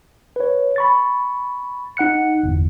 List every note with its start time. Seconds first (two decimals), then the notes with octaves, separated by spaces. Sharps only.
0.36 B4 C#5
0.76 B5 C#6 A6
1.97 D#4 F#5 F#6 C#7
2.43 G1 E2